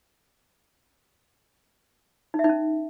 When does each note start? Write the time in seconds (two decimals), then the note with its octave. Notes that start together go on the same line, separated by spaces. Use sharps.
2.34 D#4
2.39 E5
2.44 D#4
2.49 C#4